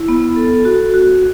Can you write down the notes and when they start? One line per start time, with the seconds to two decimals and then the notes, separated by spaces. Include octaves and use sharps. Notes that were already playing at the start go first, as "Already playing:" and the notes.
Already playing: E4
0.08 B3
0.36 A4
0.65 F#4
0.94 F#4